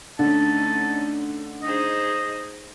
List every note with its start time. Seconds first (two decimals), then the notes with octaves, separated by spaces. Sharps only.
0.19 D3 A3 C#4 D#4 A5
1.63 D#4 G#4 C5 D#5